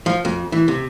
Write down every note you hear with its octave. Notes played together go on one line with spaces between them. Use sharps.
F3
F2
E3
C3